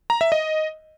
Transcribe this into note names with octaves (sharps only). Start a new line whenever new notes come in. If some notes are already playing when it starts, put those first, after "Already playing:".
A#5
E5
D#5